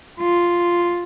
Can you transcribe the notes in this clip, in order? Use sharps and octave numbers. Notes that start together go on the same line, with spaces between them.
F4